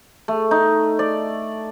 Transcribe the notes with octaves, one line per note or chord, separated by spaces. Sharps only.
A3
D#4
D5